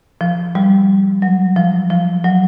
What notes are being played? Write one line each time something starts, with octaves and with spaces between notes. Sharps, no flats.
F3
G3
F#3
F3
F3
F#3